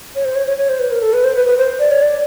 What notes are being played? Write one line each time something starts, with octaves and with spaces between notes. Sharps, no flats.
C#5
C5
C#5
C#5
C#5
C5
B4
A#4
A4
B4
C5
B4
B4
C5
D5
C#5
D5